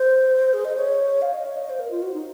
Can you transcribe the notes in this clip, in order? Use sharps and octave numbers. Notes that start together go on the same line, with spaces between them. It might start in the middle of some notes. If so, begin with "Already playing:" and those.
Already playing: C5
G#4
D#5
C#5
F5
D#5
C#5
D#5
C5
A#4
F4
F#4
D#4